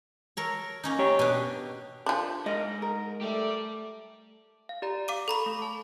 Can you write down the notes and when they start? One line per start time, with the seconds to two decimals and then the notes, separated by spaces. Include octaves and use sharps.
0.37 A4 A#4 C#5
0.83 A#3 C#4 D#4
0.99 G4 C#5
1.19 B2 D4
2.06 F3 D4
2.46 G#2 A#4 D#5
2.82 A#4
3.22 A3 G4 D5
4.69 F5
4.82 G4 D5 A#5
5.08 F5 D6 D#7
5.28 A4 A#5 B5 C#6
5.46 A3
5.59 A5 D6